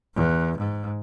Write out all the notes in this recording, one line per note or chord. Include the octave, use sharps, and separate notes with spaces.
E2
G#2